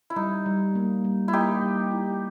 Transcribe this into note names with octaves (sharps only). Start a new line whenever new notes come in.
E4
G3 D#4
G3
A#3
G3
E4
A#3 D#4 G4
G3
E4